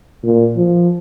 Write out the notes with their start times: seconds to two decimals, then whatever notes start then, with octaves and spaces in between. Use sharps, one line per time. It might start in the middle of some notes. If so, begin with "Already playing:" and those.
0.23 A#2
0.56 F3